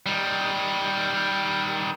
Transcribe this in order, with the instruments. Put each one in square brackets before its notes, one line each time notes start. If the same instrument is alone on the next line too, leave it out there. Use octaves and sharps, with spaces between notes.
[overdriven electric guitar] D#3 G3